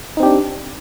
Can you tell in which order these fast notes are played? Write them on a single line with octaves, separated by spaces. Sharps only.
D#4 C4 G4 D4